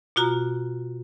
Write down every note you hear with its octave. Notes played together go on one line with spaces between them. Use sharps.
B2 F4 F#4 A#5